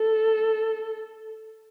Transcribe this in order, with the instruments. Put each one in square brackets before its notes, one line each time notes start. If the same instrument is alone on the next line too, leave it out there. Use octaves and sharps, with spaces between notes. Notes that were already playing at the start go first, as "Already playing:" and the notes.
Already playing: [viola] A4